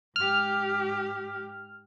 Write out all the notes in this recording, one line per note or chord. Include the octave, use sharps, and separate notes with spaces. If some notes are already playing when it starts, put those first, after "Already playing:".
G#2 G4 F6